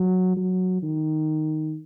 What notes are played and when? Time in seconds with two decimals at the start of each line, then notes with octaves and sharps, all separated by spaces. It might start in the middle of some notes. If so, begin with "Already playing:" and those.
Already playing: F#3
0.37 F#3
0.82 D#3